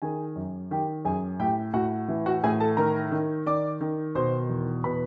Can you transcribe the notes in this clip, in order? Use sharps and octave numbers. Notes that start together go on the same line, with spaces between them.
D#3 G#4 G#5
F#2
D#3 G4 G5
F#2 G#4 G#5
A2 G4 G5
A2 F#4 F#5
E3
F#4 F#5
A2 G#4 G#5
A4 A5
D#3 A#4 A#5
D#3
D#3 D5 D6
D#3
B2 C5 C6
E2
B2 B4 B5